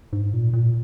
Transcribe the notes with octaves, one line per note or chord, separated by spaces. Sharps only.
G#2
A#2
A#2